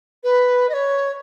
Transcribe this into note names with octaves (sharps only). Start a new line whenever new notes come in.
B4
D#5
C#5